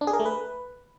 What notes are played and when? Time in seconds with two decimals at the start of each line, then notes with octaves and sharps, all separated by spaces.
0.01 D4
0.07 G#4
0.13 A#4
0.19 A3
0.26 B4